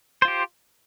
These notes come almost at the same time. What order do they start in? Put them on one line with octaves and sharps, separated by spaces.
C5 F4 G4